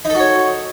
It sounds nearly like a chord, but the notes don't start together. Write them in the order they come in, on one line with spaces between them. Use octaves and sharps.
D#4 A4 F#4 C#5